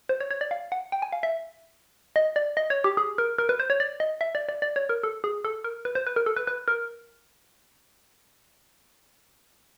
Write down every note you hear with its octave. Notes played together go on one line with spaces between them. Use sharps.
C5
C#5
C#5
D5
F5
F#5
G5
G#5
F5
E5
D#5
D5
D#5
C#5
G4
G#4
A#4
A#4
B4
C5
C#5
D5
D#5
E5
D5
D5
D5
C#5
A#4
A4
G#4
A4
A#4
B4
C5
B4
A#4
A4
B4
B4
A#4